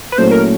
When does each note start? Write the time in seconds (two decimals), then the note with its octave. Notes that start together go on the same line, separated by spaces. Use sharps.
0.12 B4
0.18 A#2 F#3 A3 C#4 E4 C5
0.31 A#4